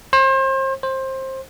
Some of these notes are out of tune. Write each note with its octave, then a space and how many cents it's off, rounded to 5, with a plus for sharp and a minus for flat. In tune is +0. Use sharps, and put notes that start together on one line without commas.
C5 +35
C5 +20